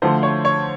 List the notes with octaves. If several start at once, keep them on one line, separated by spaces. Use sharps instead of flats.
D3 F3 A3 C5
C#5
C#5